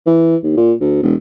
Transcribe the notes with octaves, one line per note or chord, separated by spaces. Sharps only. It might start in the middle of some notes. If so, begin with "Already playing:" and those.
E3
D#2
A#2
D2
E1